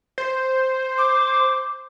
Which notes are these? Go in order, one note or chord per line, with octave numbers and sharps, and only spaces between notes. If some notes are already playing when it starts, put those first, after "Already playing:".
C5
D6